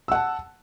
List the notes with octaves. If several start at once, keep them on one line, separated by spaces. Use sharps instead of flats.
F#5 A5 E6